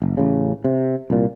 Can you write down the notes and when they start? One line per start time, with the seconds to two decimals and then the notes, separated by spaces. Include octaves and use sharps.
0.02 F#1
0.17 A1 C#3
0.64 C3
1.10 C2 A#2